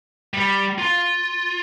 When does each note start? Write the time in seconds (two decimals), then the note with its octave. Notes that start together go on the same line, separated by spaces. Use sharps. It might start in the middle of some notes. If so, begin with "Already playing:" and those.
0.34 G3
0.78 F4